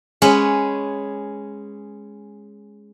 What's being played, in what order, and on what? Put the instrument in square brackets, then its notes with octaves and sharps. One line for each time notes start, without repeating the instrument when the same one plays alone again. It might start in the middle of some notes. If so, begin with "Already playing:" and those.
[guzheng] G#3 C#4 B4 C#5 F#5